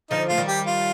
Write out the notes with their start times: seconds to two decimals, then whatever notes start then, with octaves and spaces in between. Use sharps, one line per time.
0.11 D3 F3 D#4
0.29 A3 F4
0.38 D#3 G3
0.48 G4
0.66 F4